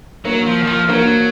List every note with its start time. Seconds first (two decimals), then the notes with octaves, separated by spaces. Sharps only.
0.25 F#3 A#3
0.46 F3
0.63 D#3
0.67 F3
0.89 F#3 A#3